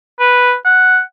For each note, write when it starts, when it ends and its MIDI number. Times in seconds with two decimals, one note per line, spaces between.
0.20 0.54 71
0.65 1.00 78